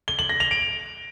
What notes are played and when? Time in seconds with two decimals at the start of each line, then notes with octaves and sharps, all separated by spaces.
0.08 G7
0.19 F#7
0.29 A#6
0.40 F7
0.51 D7